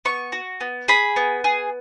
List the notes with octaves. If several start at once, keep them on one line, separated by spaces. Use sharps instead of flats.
B3 C#6
F#4
B3
G#4 B5
B3
G#4